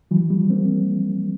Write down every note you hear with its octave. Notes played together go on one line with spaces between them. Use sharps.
E3 F#3
F3 G3
A#3 C4